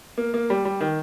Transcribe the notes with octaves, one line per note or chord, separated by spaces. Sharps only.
A#3
A#3
G3
G3
D#3